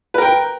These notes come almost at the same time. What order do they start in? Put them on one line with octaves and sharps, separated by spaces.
B4 A#4 G5